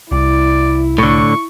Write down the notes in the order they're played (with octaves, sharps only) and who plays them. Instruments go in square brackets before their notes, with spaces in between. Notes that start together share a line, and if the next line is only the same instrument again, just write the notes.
[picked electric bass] C2 [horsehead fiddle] E4 [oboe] D5
[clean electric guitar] A2 D3 [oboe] C#6